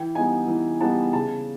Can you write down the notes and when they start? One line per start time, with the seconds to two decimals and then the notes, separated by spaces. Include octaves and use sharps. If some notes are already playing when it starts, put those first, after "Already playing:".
Already playing: E3 G5
0.15 G3 B3 D#4 G#5
0.47 E3
0.81 G3 B3 D#4 A5
1.13 C#3 A5